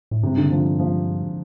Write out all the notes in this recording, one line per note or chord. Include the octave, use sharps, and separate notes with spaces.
A2
G2 C3
D3
F3
F3